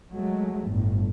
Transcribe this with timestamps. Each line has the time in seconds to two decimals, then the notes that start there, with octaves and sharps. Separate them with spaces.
0.14 F#3 G#3 A3
0.68 G1 A2